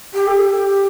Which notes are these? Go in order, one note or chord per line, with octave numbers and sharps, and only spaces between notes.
G4
A4
G4